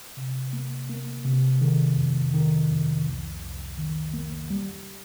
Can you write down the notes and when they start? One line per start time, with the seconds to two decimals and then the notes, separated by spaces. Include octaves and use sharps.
0.17 C3
0.53 A#3
0.89 A#3
1.25 C3
1.61 D#3
1.97 F2
2.33 D#3
2.70 F2
3.06 C2
3.42 C2
3.78 D#3
4.13 A#3
4.50 G3